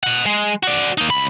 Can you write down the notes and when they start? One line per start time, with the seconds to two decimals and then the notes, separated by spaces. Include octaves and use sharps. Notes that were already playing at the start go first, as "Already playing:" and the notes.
0.03 D#5 F#5
0.26 G#3
0.63 F#4 D5
0.98 A#3 D#4
1.10 C#2 B5